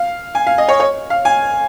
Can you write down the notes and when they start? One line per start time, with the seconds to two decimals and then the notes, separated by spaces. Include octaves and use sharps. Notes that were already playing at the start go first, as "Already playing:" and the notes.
Already playing: F5
0.35 G#5
0.47 F5
0.58 D#5
0.68 C#5
0.80 C#5
1.10 F5
1.25 G#5